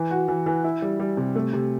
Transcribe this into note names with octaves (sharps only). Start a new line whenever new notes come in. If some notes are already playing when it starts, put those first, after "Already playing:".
Already playing: E3
F#4
E3
E3
E4
G3
G3
C3
A3
C3